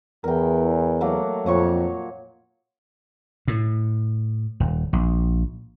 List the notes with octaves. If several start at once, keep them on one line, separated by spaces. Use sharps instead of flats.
E2 A#4 G5
F#3 A3 A#3
F2 A#2 C#5 C#6
A2
D#1
A#1